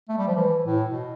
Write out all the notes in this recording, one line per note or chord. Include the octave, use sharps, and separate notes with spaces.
A3
G3
F3
E3
A2
B2